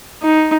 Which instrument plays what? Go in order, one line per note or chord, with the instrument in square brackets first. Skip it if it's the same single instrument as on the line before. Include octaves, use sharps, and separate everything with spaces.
[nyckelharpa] D#4